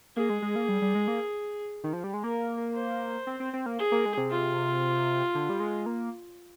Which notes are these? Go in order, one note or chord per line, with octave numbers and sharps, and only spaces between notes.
A#3 G#4
G#3
G#3
A#3
G3
G3
G#3
A#3
D#3
F3
G3
G#3
A#3 A#4
C5
C4
C4
C4
A#3
G#4
A#3
G#3
C3
F4
D3
G3
G#3
A#3